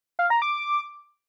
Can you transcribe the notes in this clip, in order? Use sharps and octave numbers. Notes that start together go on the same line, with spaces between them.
F5
A#5
D6